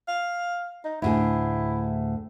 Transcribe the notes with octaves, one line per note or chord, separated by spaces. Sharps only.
F5
D#4
D2 A2 E4 G#4